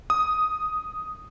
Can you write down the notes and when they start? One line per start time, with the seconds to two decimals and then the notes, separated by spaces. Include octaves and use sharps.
0.10 D#6